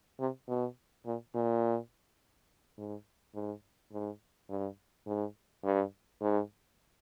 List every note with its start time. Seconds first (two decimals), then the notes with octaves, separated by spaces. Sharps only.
0.20 C3
0.48 B2
1.06 A#2
1.34 A#2
2.78 G#2
3.34 G#2
3.92 G#2
4.50 G2
5.07 G#2
5.64 G2
6.22 G#2